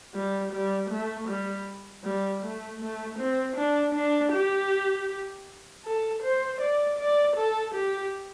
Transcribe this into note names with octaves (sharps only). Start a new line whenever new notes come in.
G3
G3
A3
G3
G3
A3
A3
C4
D4
D4
G4
A4
C5
D5
D5
A4
G4